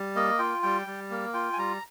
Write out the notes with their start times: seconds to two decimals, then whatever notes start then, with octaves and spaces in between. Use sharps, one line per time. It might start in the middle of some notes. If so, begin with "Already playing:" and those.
Already playing: G3
0.15 A#3 D#5
0.39 F4 G5
0.63 G3 G5
0.87 G3
1.10 A#3
1.34 F4 G5
1.53 G#5
1.58 G3 A#5